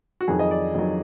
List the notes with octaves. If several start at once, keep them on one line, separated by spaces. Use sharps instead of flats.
F#4
F2 D#3 F#3 G#4
D#5
D5
F2 D#3 F#3